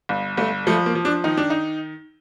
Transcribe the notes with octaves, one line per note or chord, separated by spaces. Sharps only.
G1
G1 A3
F3 A3
A#3
F3
D4
D#3 D#4
D4
D#4